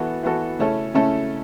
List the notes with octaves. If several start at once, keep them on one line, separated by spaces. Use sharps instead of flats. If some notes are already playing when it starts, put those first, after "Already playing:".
Already playing: E3 B3 F#4 A4
E3 B3 F#4 A4
C#3 A3 C#4 E4 A4
C#3 A3 C#4 E4 A4